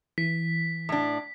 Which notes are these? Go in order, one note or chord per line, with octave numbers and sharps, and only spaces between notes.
E3 B6
A2 D4